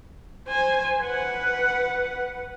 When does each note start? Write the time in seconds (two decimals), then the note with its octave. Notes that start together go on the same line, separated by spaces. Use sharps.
0.47 C5 G#5
1.03 B4 F#5